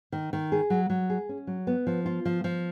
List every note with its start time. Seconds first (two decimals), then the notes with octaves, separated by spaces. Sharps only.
0.12 D#3
0.33 D#3
0.52 G#4
0.70 F#3
0.90 F#3
1.10 G#4
1.29 C#4
1.47 F#3
1.67 B3
1.87 F3
2.06 F4
2.25 F3
2.44 F3